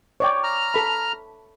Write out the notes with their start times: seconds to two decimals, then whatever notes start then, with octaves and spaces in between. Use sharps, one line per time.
0.20 C#5 D5 G5
0.44 A#5 F6
0.74 A4 B5